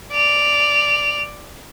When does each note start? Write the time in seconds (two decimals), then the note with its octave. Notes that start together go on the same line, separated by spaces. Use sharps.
0.12 D5 F7